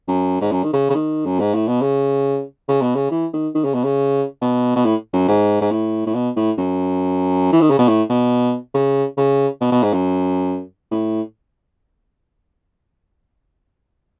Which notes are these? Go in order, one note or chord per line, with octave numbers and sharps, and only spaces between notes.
F#2
G#2
F#2
D#3
C#3
C#3
D#3
F#2
G#2
A2
B2
C#3
C#3
B2
C#3
E3
D#3
D#3
C#3
B2
C#3
B2
B2
A2
F#2
G#2
G#2
A2
A2
B2
A2
F#2
E3
D#3
C#3
B2
A2
B2
C#3
C#3
B2
B2
G#2
F#2
A2